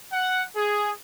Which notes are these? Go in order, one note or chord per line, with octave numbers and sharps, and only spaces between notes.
F#5
G#4